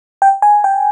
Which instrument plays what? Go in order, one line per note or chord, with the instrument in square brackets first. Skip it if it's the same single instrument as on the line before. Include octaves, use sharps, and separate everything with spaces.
[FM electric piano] G5
G#5
G5